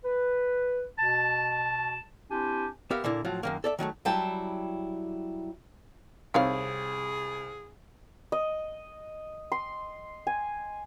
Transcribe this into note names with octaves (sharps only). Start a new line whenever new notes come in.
B4
B2 A5
C4 D4 E4 G4 G#5
B3 G4 A#4 E5 F5
A#2 D3 A#3 E4
A2 F3 F#3 F4
F#2 D#3 A#3
A4 D5 E5
D#3 F#3 G#3 A3
F#3 G3 E4 G5 A5
C2 D#4 G#4 C#5 F5
D#5
C6
G#5